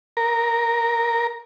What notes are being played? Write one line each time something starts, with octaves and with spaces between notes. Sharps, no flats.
A#4